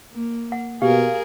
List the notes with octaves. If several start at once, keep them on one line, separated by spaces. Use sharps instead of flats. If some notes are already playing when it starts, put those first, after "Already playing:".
A#3
F#5
B2 G4 G#4 A#4 F5